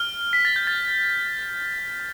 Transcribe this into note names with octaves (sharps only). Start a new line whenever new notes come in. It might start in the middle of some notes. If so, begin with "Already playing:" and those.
Already playing: F6
B6
A6
G6
A6